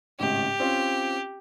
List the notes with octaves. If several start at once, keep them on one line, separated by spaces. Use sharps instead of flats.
G#1 A2 C#3 G4
C4 C#4 F4